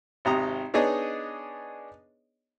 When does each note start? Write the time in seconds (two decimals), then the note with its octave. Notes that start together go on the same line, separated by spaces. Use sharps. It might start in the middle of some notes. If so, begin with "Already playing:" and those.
0.25 G#1 C3 A#5 D#6
0.74 B3 D4 D#4 G#4 C#5 D#5